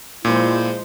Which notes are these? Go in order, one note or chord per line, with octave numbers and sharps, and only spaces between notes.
A#2 F3 G#3 E4 C5